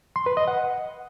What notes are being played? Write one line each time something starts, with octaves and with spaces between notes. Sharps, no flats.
C6
B4
D#5
F#5